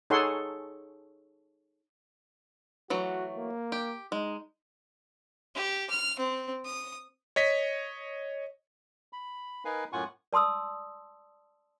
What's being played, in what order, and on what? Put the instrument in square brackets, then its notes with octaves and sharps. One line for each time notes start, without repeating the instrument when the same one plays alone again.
[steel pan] D#4 G#4 A4 C#5 F#5 C6
[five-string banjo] E3 F#3 A3 [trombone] F#4
[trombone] A#3
[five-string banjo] G4
[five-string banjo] G#3 [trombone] D#4
[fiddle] G4
F6
C4
D#6
[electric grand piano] C#5 D#5 B6
[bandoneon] B5
D#4 A#4 B4 F5 G#5
F#2 A2 F4 F#5 G#5 C#6
[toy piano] D5 A5 C6 D#6 E6